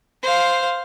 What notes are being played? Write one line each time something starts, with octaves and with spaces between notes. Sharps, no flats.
C5 F5